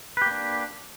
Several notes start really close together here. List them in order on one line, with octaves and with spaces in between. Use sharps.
B4 G4 A#3 D4